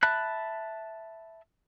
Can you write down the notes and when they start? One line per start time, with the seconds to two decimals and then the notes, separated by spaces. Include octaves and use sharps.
0.03 E5 A5 B5 F#6